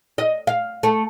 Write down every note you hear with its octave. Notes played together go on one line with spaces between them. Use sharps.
D#5
F5
A3